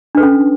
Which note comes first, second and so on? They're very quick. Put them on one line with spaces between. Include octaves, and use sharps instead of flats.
D4 B4 A4 C#4